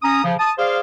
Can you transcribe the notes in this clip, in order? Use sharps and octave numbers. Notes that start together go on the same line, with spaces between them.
C#4 A#5 D#6
C#3 F3
A5 D#6
G#4 C5 D5 F5